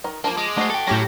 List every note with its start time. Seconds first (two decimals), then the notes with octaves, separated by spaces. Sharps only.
0.04 D#3 A#4
0.24 F3 A#3 F4 A5
0.37 G#3 D6
0.57 A3 F#4 C5 D#5
0.70 A4 G5
0.87 A2 F#3 C#4 G4 A#6